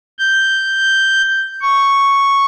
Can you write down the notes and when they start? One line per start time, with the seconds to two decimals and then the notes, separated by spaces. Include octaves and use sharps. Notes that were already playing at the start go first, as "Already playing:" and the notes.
0.19 G6
1.61 C#6